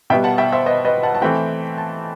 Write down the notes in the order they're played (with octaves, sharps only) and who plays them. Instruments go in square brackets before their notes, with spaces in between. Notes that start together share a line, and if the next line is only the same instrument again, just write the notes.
[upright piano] B2 G3 B3 E5 G5
F#5 A5
E5 G5
C5 E5
B4 D#5
B4 D#5
F#5 A5
A5
E3 A3 C4 E5 G5
A5